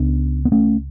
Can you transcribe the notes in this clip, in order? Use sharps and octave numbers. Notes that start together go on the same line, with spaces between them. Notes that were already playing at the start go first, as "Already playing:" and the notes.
Already playing: C#2 C#3 B3 D4
B3
A3 C#4